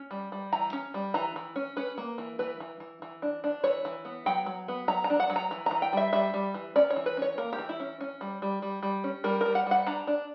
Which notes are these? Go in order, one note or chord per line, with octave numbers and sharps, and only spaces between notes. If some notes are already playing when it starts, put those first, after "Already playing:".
Already playing: C#4
G3
G3
E3 A#5
C#4
G3
E3 A#5
E3
C#4
C#4 B4
A#3
E3
E3 B4
E3
E3
E3
D4
D4
E3 C#5
E3
B3
F#3 G5
F#3
B3
F#3 A#5
A#5
D4
F#5
F#3
A#5
E3
E3 A#5
G5
G3 E5
G3 E5
G3
E3
C#4 D5
C#5
E3
B4
C#4 C#5
A#3 A#4
G4
E3
E4
C#4
C#4
G3
G3
G3
G3
C#4
G3 A#4
G3 A#4
F#5
G3 F#5
D4 A#5
D4